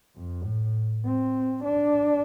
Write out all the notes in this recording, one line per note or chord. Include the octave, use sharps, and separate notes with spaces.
F2
A2
C4
D4